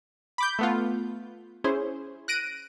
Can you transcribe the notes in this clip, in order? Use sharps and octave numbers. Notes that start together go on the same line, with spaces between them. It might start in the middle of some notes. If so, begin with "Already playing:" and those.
B5 D6 G6
A3 B3 F4
C#4 E4 G#4 C5
F#6 A#6 D7 D#7